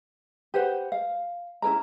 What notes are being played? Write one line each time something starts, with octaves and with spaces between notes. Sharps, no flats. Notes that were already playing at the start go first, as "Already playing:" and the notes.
G4 B4 C5 F#5
F5
C#4 E4 A#4 A#5